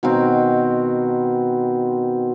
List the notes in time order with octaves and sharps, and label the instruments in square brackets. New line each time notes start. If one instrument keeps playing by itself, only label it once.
[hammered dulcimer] B2 D#3 B3 C4